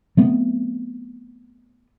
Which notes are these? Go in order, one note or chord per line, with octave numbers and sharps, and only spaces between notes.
F#3 A3 B3 C4